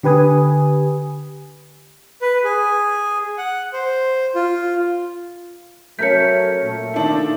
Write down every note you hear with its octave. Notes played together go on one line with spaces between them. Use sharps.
D3 G4 B4 G#5 D#6
B4
G#4
F#5
C5
F4
F#3 A3 C#4 A#4 G6 B6 C#7
A#2 A3
D#3 D4 E4